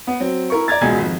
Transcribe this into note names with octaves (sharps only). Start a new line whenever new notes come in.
B3
F#3 C4
E4 A#4 C#6
D5 A#5 G#6 A6
E1 C#2 B2 G#3 G#5 G#6
G#1 F2